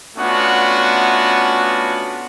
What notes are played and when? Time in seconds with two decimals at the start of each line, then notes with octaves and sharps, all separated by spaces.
0.16 A3 B3 C#4 D4 F4 F#4